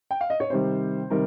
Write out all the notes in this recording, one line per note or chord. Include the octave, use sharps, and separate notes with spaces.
G5
F5
D#5
C#5
C3 D#3 G3 C5
C3 D#3 G3 A#4